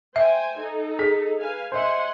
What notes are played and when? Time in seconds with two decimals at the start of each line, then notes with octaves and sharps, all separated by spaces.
0.16 C5 E5 G5 G#5
0.58 D#4 A4
0.99 G#4 B6
1.39 B4 F5 G#5
1.72 C5 D#5 E5 F#5 G#5 C6